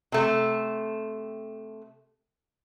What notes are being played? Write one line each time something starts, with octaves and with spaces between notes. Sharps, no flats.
C3 A3